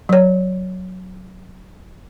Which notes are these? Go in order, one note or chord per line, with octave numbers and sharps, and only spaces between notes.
F#3 C#5